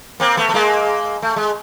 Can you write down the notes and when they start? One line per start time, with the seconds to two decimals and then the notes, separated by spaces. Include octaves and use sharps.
0.20 A#3 C4
0.37 A3 B3
0.49 B3
0.54 G#3 A#3
1.22 A3
1.36 G#3